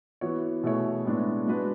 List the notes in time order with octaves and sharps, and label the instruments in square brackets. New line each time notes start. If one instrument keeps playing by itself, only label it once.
[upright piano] E3 B3 F#4 C#5
B2 A3 E4 G#4 C#5
A2 G#3 B3 D4
G#3 D4 F#4 B4